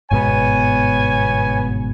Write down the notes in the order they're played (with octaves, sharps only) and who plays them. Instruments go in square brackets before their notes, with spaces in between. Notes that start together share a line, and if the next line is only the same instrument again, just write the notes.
[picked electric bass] G1 G#2 B2 [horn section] B3 C#5 G#5